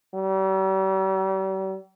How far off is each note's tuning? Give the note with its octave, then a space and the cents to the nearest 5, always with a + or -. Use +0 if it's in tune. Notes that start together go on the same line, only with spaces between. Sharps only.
G3 -40